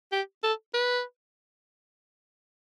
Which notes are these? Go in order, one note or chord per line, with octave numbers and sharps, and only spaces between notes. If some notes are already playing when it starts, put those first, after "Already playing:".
G4
A4
B4